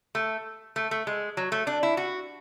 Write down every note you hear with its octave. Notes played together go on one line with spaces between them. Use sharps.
A3
A3
A3
G#3
F#3
A3
D4
E4
F#4